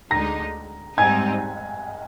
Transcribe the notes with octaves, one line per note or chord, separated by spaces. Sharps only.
D2 D3 G#3 D#4 A#5 A#6
G#2 G3 C4 D#4 G#5 G#6